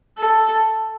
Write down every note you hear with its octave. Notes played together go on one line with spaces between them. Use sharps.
A4